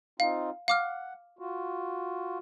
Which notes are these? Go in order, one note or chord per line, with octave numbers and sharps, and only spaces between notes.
C4 D#4 F4 F5
F5 F#5 D6 F6
F4 F#4